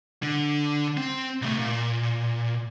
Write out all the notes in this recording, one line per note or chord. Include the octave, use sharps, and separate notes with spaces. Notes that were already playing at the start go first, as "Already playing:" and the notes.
D3
C4
C2 A3
A#2